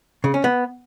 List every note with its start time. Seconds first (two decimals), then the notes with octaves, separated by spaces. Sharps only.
0.24 C#3
0.34 C#4
0.44 B3